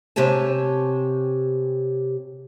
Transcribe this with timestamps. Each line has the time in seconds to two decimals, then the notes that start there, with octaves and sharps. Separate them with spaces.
0.16 C3 G4 C#5 G#5 A5